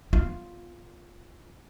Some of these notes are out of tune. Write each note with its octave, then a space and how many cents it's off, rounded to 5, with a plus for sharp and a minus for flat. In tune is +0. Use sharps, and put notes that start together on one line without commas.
B3 +0 F4 +0